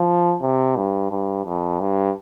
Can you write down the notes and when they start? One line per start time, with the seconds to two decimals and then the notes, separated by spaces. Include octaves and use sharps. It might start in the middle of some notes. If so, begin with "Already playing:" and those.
Already playing: F3
0.42 C3
0.76 G2
1.11 G2
1.46 F2
1.80 G2